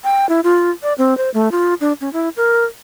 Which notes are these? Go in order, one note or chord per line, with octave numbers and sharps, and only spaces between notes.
G5
E4
F4
D5
C4
C5
A3
F4
D4
C#4
E4
A#4